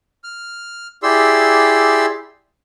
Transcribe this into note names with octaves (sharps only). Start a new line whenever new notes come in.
F6
E4 G4 G#4 D5 C6 E6